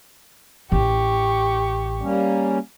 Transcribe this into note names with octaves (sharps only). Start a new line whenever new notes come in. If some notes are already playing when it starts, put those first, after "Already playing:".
A1 G4 C#6
G3 A#3 C#4